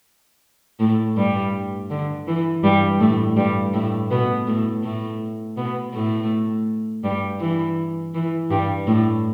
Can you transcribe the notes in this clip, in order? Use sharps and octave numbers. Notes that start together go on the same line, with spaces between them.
A2 A3
G2 G3
D3
E3
G2 G3
A2 A3
G2 G3
A2 A3
B2 B3
A2 A3
A2 A3
B2 B3
A2 A3
G2 G3
E3
E3
G2 G3
A2 A3